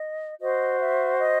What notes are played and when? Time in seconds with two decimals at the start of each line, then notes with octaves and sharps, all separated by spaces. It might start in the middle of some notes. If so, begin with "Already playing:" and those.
Already playing: D#5
0.41 F#4 C5 D#5
0.80 E5
1.19 D#5